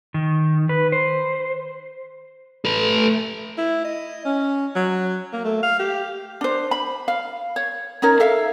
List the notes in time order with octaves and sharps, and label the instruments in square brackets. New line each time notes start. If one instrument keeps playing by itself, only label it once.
[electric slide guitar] D#3
B4
C5
[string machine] A3 [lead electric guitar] A4 B4
[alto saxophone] E4
D#5
C#4
F#3
A#3
A3
F5
G4
[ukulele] D4 C5
B5
F5
C#5
C#4 D#4 A#4 C#5
A4 E5 F5